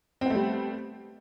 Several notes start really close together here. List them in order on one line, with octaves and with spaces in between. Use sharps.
C4 B3 A3 G3